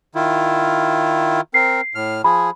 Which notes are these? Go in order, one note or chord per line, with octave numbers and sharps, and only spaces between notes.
D#3 E4 F4
C4 A#4 C7
A2 F6
F3 G#4 B5